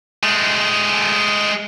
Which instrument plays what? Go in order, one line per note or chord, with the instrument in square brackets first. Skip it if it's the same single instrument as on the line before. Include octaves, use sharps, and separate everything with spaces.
[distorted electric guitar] G#3 A3